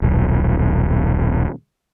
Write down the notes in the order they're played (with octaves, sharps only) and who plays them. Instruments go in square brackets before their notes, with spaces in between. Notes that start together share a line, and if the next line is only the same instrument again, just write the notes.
[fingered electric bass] D#1 B1